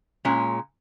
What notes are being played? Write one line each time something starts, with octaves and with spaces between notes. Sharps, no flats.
A#2 G#3 C#4